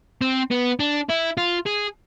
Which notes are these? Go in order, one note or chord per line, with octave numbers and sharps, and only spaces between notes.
C4
B3
D4
E4
F4
G#4